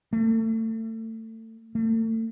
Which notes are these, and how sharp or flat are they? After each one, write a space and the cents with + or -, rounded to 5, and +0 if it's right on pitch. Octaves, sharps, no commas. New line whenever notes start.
A3 +30
A3 +35